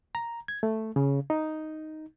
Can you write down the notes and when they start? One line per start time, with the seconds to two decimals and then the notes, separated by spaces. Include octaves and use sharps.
0.15 A#5
0.48 G#6
0.63 A3
0.96 C#3
1.30 D#4